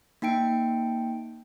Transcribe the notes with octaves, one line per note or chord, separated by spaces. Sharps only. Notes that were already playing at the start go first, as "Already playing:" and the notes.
A#3 D#4 G5 D7